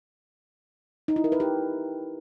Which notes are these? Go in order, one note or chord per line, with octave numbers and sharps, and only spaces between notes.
D#4
E4
A#4
B4
G4